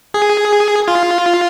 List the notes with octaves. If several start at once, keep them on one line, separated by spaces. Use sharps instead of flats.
G#4
F4